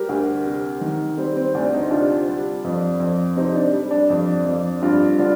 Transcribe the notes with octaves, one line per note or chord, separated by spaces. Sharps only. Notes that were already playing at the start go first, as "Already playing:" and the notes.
Already playing: G3 G4 A#4
D2
C3
D#3
G3 C4
C4
D2 D4
C4 D#4
C3 D4 F4
G3
F2
F2
C3 C4 D#4
D4
G3
D4
F2
F2
G2 D4 F4
D3 D4 F4